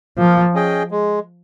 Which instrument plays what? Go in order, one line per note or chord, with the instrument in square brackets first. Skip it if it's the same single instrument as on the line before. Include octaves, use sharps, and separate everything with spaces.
[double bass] F3 [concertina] A#3
[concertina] C#4 G#4 D#5 G5
G#3